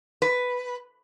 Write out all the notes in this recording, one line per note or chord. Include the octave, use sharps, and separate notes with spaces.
B4